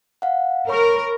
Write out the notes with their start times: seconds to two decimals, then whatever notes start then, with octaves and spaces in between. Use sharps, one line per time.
0.22 F5 F#5
0.69 A#4 C#5 B5 C#6